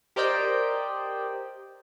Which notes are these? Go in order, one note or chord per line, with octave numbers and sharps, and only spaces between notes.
G4 A#4 C5 D5 D#5 G5